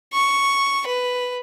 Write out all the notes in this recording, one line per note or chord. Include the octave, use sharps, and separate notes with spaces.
C#6
B4